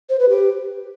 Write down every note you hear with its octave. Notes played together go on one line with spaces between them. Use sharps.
C5
B4
G4